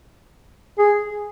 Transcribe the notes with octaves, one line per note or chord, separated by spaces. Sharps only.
G#4